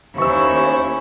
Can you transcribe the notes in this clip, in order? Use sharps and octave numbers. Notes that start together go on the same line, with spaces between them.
D#2 C#4 E4 C5 C#6 E6